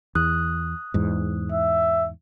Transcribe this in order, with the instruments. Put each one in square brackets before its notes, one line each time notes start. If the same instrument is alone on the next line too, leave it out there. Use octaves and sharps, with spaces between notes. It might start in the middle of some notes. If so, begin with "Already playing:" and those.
[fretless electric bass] E2 [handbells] D#6 F#6
[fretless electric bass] E2 G#2
[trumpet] E5